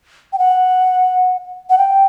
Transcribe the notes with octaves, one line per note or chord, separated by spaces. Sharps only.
G5
F#5
F#5
G5